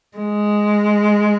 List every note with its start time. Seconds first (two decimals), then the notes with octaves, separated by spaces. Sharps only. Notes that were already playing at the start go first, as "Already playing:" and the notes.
0.18 G#3